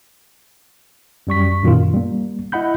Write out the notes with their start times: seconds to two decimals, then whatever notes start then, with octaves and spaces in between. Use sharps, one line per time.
1.27 F#2 G3 C#6 B6
1.63 F#2 A#2 D#3 F4
1.94 G3 A#3
2.52 E4 D#5 F#5 B5 G6